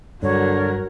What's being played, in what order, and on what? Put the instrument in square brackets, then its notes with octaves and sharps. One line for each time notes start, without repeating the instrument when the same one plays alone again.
[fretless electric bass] G2 [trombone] D3 [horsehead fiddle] F#3 A#4 [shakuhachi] C#5